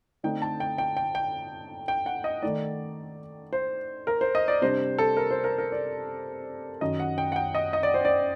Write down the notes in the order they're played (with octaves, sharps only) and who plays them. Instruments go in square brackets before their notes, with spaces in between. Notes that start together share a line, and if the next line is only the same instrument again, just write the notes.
[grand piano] D3 A3 C4 D#4 G5
A5
G5
G5
G5
G5
G5
F#5
D#5
D#3 A3 D#4 D5
C5
A#4
C5
D#5
D5
C3 G3 D4 C5
A4
A#4
C5
A#4
A#4
D5
F#2 D#3 F#3 D#5
F#5
G5
F#5
G5
D#5
D#5
D5
C5
D5